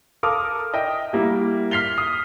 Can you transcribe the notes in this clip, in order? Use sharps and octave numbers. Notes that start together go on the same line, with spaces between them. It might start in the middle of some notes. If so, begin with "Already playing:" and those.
A4 A#4 F5 D6 D#6 F6
D#5 E5 G5
G3 A#3 E4 F#4
F6 B6 C7 F7 G7
D#6